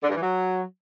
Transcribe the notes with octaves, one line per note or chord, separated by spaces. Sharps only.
D3
G2
E3
F#3